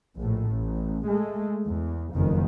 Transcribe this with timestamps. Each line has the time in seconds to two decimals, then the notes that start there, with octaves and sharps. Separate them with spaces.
0.16 A#1 A2
0.50 A1
1.07 G#3 A3
1.66 E2
2.14 F#1 F2 D#3